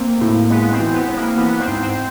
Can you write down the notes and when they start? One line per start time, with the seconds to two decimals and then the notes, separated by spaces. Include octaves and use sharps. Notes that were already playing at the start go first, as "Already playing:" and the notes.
Already playing: A#3 C4
0.21 A2
0.50 G#3 B3
0.72 C4
0.80 E3
0.94 B3
1.09 C4
1.17 A#3
1.37 E3 B3
1.60 C4
1.67 G#2
1.81 C4